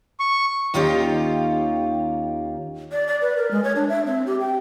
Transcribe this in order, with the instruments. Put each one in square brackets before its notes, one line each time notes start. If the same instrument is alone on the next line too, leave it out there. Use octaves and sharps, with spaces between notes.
[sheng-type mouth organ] C#6
[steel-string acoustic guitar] D#2 D#3 C#4 F4 G4 C#5
[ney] D5
D5
B4
A#4
G#3
C#5
D4
E5
C4
G4
G5